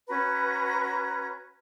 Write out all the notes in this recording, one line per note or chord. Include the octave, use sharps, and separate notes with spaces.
C#4 F#4 B4 A#5